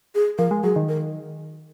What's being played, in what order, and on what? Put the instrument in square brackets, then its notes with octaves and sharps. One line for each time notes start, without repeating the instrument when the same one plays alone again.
[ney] G#4
[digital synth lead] F3 [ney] A#4
[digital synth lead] G#3
[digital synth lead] F#3 [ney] G#4
[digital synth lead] D#3
[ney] A#4